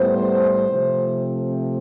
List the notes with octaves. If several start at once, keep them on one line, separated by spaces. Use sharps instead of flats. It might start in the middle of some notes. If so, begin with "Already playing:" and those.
Already playing: A2 G3 B3 C5
C3 F3 A3 C4